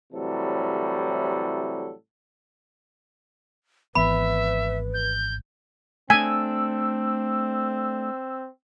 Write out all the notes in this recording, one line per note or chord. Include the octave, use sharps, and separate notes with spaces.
A2 C3 E3 F#3 G3 A4
G#1 E3 B3 B4 E5 B5
G6
A3 C4 D4 G#5 E6